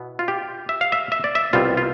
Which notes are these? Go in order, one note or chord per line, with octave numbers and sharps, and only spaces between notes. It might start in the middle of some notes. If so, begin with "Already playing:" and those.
Already playing: B2 B3 E4
F4
G4
E5
F5
E5
E5
D5
E5
C2 B2 G3 B3 F4
F4